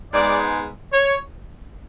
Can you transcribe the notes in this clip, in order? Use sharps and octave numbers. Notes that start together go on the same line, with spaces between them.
G#2 G#3 B3 D5
C#5